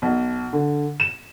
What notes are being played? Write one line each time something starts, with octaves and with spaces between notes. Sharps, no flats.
B1
D3
E7